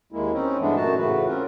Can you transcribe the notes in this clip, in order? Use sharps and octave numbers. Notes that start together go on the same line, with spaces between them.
D#2 G#3 A#3 E4
C4 C#4 D#4
G2 E3 G#3 A3 B3 D4
F#2 A#2 A3 D#4 F#4 A5
A2 C#3 E3 A3 F#4 B4
C4 C#4 F4 A#4